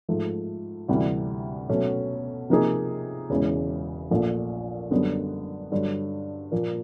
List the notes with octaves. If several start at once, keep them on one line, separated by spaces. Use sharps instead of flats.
G#2 F3 A3
D2 C3 E3 G3
B2 F#3 A3 C#4
C3 F3 A#3 D#4 G#4
E1 E2 C#3 E3 G#3
A#1 A#2 F3 A3
F#1 F#2 D3 G3 B3
G2 D3 F#3
A#2 F3 A#3